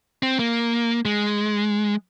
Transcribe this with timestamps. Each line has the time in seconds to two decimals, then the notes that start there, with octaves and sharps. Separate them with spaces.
0.23 C4
0.39 A#3
1.05 G#3